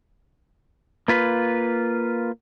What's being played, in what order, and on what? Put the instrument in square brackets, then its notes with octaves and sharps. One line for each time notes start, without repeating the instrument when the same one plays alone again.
[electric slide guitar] A#3 F4 B4